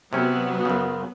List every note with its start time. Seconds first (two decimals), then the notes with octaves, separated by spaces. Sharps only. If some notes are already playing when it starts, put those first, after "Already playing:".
0.13 C3 F#3 B3 C#4
0.65 F#2 C#3